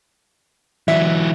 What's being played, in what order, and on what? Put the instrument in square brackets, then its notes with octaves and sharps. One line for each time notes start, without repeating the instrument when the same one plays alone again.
[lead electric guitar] E3 F#3 [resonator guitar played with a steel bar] E5